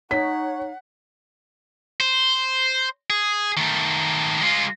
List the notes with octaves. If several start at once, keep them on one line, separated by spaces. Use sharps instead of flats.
D#4 C#5 F#5 B6
C5
G#4
D#3 A3
G#3 F4